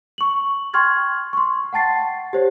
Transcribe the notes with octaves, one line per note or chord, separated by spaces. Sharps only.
C#6 F#7
G5 C6 C#6 F6 G#6 A6
C6 C#6
F#5 G5 A5 A6 C7
G4 C5 C#5